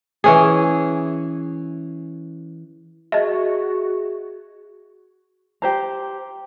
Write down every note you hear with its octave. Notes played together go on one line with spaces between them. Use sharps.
E3 C#4 G#4
F#4 G#4 D#5 E5
G4 C5 A#5